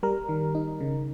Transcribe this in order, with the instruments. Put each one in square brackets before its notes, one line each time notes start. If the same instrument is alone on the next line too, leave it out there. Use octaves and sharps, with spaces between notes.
[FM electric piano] G3 A#4
D#3
D#4
C#3